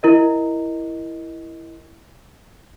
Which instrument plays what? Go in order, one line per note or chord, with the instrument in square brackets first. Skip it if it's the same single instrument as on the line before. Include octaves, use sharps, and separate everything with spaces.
[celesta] E4 A#4 D#5